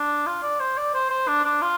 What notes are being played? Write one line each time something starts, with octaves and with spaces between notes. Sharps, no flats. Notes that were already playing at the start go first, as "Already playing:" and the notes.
Already playing: D4
F4
D5
C5
D5
C5
C5
D4
D4
F4